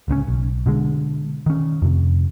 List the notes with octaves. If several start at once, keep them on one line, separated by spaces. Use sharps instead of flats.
D1 C#2 C4 C#4
B1
B2 D3 G#3
D#3 C#4
F2 C3